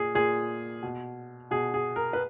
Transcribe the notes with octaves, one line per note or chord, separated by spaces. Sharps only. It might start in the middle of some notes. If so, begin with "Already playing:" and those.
Already playing: A#2 G#4
A#2 G#4
B2
B2 G#4
G#4
A#4
B4